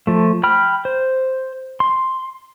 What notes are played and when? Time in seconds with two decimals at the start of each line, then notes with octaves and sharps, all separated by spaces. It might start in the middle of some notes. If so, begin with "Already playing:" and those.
0.07 F3 A3
0.43 G5 B5 F6
0.85 C5
1.80 C6